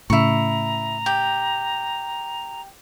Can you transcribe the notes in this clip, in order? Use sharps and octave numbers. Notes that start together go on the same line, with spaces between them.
A2 C#3 E4 A#5 C#6
G4